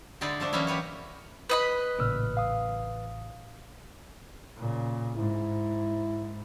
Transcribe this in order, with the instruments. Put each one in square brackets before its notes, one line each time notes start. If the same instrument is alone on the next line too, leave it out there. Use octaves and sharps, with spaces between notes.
[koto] D3 G#3 D#4 E4 D5
F3 A3 D4
E3 F#3 A#3 C#4 D#4 E4
F#3 G4 B4 C#5
[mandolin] B4 D#5 B5
[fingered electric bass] A1 C#3 [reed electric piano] A#2 E6 F6
[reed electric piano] F5 D#6
[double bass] A#2 C#3
[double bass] G#2 [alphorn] E4